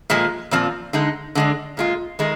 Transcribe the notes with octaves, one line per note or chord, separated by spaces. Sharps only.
A#2 F3 G#3
A#2 F3 C4 F4
D3 G#3 D#4
D3 G#3 D4
A#2 G#3 D4 F4
D#3 G#3 D#4